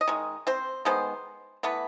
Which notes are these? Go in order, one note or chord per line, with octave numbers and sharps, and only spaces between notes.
D#5
D#3 G#3
C4 C5
D#3 G#3 B3 C5
E3 A3 B3 B4